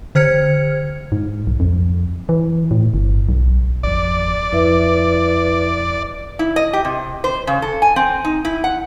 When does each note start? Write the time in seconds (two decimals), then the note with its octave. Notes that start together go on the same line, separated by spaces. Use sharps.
0.15 D3 C5 F6 G#6 C#7
1.12 G#2
1.47 B1
1.60 F2
2.29 E3
2.71 A2
2.94 G1
3.29 B1
3.83 G#1 F2 D5
4.52 F2 E4 B4 E5
6.39 E4
6.56 D#5
6.73 G4
6.85 C3
7.24 C5
7.47 C#3
7.62 A4
7.82 G#5
7.96 C4
8.25 D#4
8.45 E4
8.64 F#5